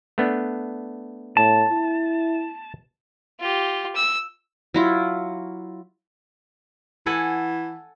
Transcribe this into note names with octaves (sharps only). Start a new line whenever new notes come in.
A3 B3 D4
A2 A5
E4
F4 G4
E6
F#3 E4 F4
E3 A4 F#5 G#5